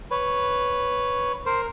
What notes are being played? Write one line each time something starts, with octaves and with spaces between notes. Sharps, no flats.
B4 C#5
A#4 C5